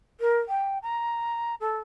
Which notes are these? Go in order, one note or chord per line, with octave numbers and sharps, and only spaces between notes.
A#4
G5
A#5
A4